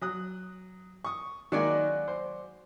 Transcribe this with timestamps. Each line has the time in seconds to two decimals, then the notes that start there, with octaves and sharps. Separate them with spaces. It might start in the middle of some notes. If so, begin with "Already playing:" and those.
0.01 F#3 D#6 F#6
1.05 C#6 D#6
1.52 D#3 F#3 G#3 A#3 D5 G#5
2.08 C5